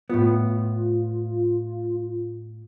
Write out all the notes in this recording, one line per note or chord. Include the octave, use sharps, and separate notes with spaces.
A2 B3 F4